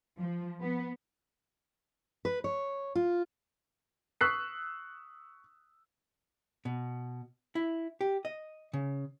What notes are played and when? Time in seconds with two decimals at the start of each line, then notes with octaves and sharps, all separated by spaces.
0.18 F3
0.62 B3
2.25 B4
2.44 C#5
2.95 F4
4.21 C#6 D#6 E6 F#6 B6 C7
6.65 B2
7.55 E4
8.01 G4
8.25 D#5
8.73 C#3